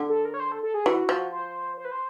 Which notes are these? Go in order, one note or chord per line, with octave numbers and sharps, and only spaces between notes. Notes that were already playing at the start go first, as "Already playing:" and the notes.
Already playing: D3
A4
A#4
C#5
C5
A4
A4
G#4
E3 F#4
F3
C5
C5
B4
C5